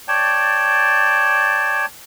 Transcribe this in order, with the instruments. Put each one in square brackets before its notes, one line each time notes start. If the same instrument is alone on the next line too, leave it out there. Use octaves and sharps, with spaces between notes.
[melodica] C#5 D5 G5 A5